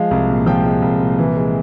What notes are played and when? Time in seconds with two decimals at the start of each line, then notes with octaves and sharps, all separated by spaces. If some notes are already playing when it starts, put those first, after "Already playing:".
Already playing: F3 G#3 F5
0.11 C2
0.30 A#2
0.46 F3 G5
0.64 G#3
0.82 C2
1.00 A#2
1.19 E3
1.36 G#3